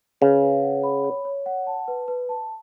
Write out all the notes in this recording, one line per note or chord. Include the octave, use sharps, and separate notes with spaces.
C#3 B4
B4
F#5
B5
C#5
C#5
F#5
A5
B4
B4
A5